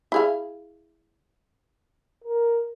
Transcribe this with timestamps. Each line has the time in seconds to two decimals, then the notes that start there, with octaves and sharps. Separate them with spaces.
0.12 E4 G#4 F5
2.24 A#4